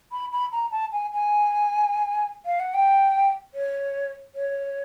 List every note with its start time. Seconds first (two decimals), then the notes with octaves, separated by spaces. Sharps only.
0.12 B5
0.32 B5
0.52 A#5
0.72 A5
0.92 G#5
1.13 G#5
2.46 F5
2.60 F#5
2.74 G5
3.54 C#5
4.35 C#5